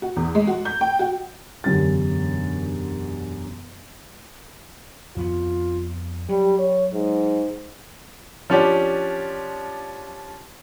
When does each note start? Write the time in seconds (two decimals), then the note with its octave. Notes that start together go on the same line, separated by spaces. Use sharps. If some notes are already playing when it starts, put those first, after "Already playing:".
0.02 F#4
0.16 E2
0.35 G#3
0.47 F#4
0.65 G6
0.81 G5
0.99 F#4
1.64 E1 F#2 D3 G4 A6
5.16 F2 B3 F4
6.29 F#3 G3
6.59 C#5
6.93 G#2
8.50 F3 C#4 D4 G4